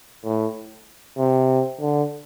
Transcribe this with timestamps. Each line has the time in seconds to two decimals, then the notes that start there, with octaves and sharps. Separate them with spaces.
0.25 A2
1.18 C3
1.81 D3